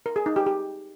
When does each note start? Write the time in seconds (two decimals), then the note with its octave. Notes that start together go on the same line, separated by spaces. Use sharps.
0.06 A#4
0.16 G#4
0.26 D#4
0.36 G4
0.46 G4